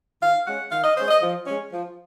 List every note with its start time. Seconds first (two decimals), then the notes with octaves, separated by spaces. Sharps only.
0.21 D#3 F5
0.46 G#3 C#4 F#5
0.70 D#3 F5
0.83 D#5
0.96 G#3 C#4 C5
1.08 D#5
1.21 F3
1.46 G#3 C#4
1.72 F3